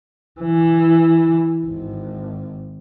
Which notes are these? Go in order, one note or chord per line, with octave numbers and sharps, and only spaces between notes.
E3
G#1